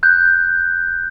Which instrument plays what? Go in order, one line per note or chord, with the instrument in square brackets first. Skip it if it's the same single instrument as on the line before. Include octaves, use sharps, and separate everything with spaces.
[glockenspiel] F#6 G6